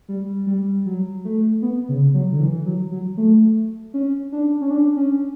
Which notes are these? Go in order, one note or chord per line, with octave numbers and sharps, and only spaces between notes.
G3
G3
F#3
A3
B3
C#3
F#3
D3
E3
F#3
F#3
A3
C#4
D4
C#4
D4
C#4